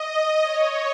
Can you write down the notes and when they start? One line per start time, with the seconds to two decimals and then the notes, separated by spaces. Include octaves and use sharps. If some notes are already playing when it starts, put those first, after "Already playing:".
Already playing: D#5
0.42 C#5